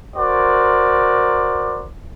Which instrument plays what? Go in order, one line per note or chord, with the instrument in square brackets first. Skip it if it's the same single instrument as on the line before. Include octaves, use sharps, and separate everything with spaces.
[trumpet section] F#4 A#4 C5 D5